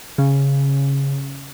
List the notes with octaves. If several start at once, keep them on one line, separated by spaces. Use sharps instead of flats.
C#3